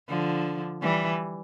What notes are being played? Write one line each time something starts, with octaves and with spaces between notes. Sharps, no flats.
D3 F3
E3 G3